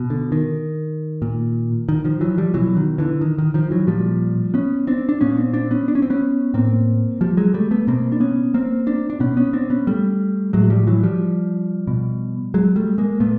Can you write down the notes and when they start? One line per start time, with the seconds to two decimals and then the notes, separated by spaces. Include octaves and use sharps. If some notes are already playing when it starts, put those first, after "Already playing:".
Already playing: B2
0.10 D3
0.32 D#3
1.22 A#2
1.89 D#3
2.05 D#3 F3
2.21 E3 F#3
2.38 F3 G3
2.54 B2 E3 F#3
2.77 D#3
2.98 D3 E3
3.21 D#3
3.38 D#3
3.54 D#3 F3
3.71 E3 F#3
3.87 A#2 F3 G3
4.54 B3 C#4
4.87 C4 D4
5.09 D4
5.21 A#2 B3 C#4
5.37 C4 D4
5.54 C4 D4
5.71 B3 C#4
5.88 D4
5.95 C#4
6.02 C4
6.10 B3 C#4
6.54 A2 A#3 C4
7.21 F3 G3
7.37 F#3 G#3
7.54 G3 A3
7.71 A3 B3
7.87 B2 A#3 C4
8.12 D4
8.20 B3 C#4
8.54 A#3 C4
8.87 C4 D4
9.10 D4
9.20 B2 B3 C#4
9.37 B3 C#4
9.53 C4 D4
9.70 B3 C#4
9.87 G3 A3
10.53 A2 F#3 G#3
10.64 F#3
10.70 F3 G3
10.87 E3 F#3
11.03 F3 G3
11.87 B2
12.54 F#3 G#3
12.76 G3 A3
12.98 G#3 A#3
13.20 A#2 A3 B3